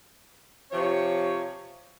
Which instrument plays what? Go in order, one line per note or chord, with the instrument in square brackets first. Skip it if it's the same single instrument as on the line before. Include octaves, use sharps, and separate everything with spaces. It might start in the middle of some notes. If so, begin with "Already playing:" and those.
[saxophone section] C3 F3 C#5